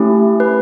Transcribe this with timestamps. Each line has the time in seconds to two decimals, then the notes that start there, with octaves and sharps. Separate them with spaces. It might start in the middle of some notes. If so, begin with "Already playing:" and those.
Already playing: A3 C#4 E4 G4
0.40 B4